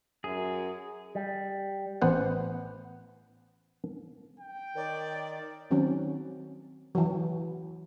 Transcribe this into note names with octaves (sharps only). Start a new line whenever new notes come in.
F#2 G#4
G3
A1 B3 C5 F#5
G5
D#3 A#4 C#5 D5
D#3 F#3 C4 C#4
E3 F#3